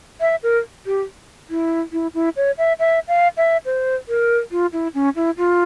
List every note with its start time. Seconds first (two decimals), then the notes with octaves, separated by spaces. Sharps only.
0.21 E5
0.43 A#4
0.86 G4
1.50 E4
1.93 E4
2.14 E4
2.36 C#5
2.58 E5
2.79 E5
3.08 F5
3.37 E5
3.65 C5
4.09 A#4
4.52 F4
4.73 E4
4.95 C#4
5.16 E4
5.37 F4